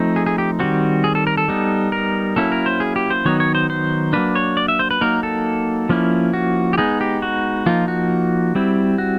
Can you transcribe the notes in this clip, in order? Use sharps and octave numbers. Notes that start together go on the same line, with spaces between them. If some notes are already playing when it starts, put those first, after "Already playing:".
Already playing: F3 A3 C4 D#4
G#4
G#4
G4
D#3 G3 C4 F#4
G#4
A4
A#4
A4
G3 B3 D#4
A#4
F#3 A#3 C#4 E4 A4
A#4
C5
G#4
G4
C5
D#3 F#3 B3 D#4 C#5
C#5
C5
C5
F#3 A#3 D4 B4
C#5
D5
E5
C5
B4
F#3 A#3 D#4 A#4
A4
F3 A#3 C#4 E4
F#4
G4
G#3 B3 D#4 G#4
G4
F#4
F3 A#3 D#4 F4
F#4
G3 C4 E4
F#4